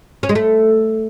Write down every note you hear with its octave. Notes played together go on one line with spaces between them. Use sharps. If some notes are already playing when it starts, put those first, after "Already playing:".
C#4
G#3
A3